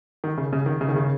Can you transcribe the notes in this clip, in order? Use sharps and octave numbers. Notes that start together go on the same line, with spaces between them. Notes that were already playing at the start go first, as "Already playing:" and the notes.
D#3
C#3
C#3
D#3
C#3
D#3
C#3